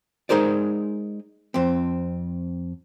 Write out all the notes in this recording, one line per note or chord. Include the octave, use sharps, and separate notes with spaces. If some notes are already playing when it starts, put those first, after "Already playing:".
G#3 D#4 G#4 A#4 C5 D5
F2 C4